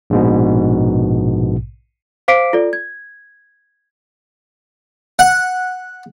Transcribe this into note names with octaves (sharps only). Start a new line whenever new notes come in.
A#1 G#2 B2
C5 F5 D6 B6 C7 D7
F4 A4 D5
G#6
F#5